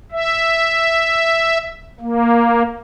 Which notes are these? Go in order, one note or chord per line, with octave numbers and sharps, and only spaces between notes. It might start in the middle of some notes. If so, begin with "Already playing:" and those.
E5
A#3